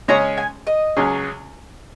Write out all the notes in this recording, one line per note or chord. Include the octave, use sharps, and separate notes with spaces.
C#3 G#3 C#4 G#4 C#5 A#5
G#5
D#5
C#2 C#3 F#3 C#4 G#4